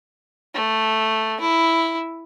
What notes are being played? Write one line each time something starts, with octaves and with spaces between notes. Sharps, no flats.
A3
E4